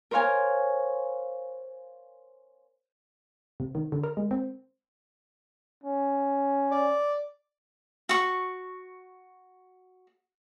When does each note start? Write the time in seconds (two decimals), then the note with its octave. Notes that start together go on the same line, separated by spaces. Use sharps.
0.11 A#4 C5 C#5 F5 G#5
3.60 C3
3.75 D#3
3.92 D3
4.04 A#4
4.17 G#3
4.31 C4
5.84 C#4
6.71 D5
8.09 F#4 C#6